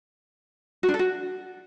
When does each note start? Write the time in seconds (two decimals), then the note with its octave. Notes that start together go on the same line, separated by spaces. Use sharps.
0.83 F#4
0.89 D4
0.94 A4
0.99 F#4